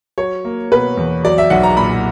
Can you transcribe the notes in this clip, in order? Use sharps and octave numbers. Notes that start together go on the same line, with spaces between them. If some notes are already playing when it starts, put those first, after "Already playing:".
F#3 C#5
A#3
B2 B4
E2
F#3 D5
E5
B1 F#5
A#5
A#2 B5